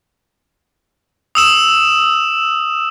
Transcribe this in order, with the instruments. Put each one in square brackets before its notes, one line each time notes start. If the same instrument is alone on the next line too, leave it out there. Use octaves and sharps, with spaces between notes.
[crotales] D#6 E6 E7